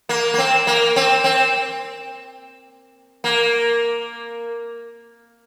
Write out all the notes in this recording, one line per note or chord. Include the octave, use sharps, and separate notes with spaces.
A#3
A#3
C4
A#3
C4
C4
A#3